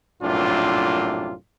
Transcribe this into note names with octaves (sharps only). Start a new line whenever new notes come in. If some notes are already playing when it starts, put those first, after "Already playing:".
A#1 F#2 A2 C3 D4 F4